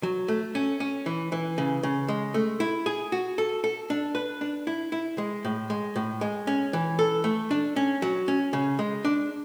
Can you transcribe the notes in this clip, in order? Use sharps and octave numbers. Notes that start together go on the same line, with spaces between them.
F#3
A3
C#4
C#4
E3
E3
C#3
C#3
G#3
A3
E4
G#4
F#4
A4
A4
D4
B4
D4
E4
E4
G#3
A2
G#3
A2
G#3
C#4
E3
A4
A3
D4
C#4
F#3
C#4
C#3
G#3
D4